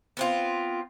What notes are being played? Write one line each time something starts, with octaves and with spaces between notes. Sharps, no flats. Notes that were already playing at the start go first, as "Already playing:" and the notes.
B3 C4 F4